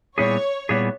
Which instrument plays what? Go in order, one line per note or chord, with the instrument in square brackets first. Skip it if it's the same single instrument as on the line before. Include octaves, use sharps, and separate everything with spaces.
[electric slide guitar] A#2 G3 B3 E4 G#4 [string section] C#5
[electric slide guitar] A#2 G3 B3 E4 G#4